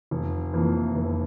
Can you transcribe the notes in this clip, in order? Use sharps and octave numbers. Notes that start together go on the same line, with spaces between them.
F1
F2 E3 A#3
F1